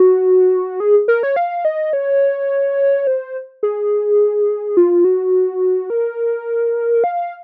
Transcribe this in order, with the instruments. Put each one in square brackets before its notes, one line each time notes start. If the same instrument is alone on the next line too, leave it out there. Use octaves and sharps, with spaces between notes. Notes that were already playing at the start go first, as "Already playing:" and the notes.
Already playing: [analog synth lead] F#4
G#4
A#4
C#5
F5
D#5
C#5
C5
G#4
F4
F#4
A#4
F5